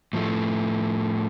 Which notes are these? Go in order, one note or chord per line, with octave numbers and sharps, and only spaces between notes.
A2 F3 A3